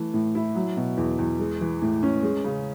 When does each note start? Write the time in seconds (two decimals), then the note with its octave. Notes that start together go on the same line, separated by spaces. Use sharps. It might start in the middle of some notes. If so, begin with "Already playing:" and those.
Already playing: E3 A3
0.14 A2
0.35 E4
0.55 F#3
0.77 B2
0.97 E2
1.18 E2
1.39 G#3
1.61 E3
1.82 A2
2.03 C#4
2.23 G#3
2.44 C#3